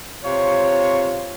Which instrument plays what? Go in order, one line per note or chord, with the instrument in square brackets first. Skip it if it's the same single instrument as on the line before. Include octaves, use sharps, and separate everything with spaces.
[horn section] C3 F4 C#5